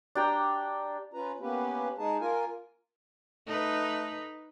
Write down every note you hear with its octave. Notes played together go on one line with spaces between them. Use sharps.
D4 G4 G5 A#5
C#4 F4 B4 A#5
A#3 B3 C#4 G4 B4
G#3 D#4 G#4 A5
A#3 F4 A#4 G#5
A3 D#4 B4